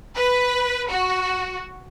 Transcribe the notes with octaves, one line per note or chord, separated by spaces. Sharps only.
B4
F#4